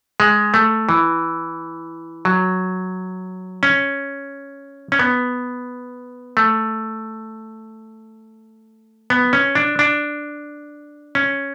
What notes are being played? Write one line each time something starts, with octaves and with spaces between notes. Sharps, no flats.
G#3
A3
E3
F#3
C#4
C#4
B3
A3
B3
C#4
D4
D4
C#4